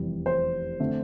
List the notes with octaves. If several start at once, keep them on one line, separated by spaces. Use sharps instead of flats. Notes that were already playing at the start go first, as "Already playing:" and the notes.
Already playing: F1 E2 C3 E3 G3
C5
D3 A3 C4